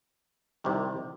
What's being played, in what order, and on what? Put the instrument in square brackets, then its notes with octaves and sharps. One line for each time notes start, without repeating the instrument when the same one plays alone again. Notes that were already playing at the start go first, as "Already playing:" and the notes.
[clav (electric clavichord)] C2 C3 D#3 G3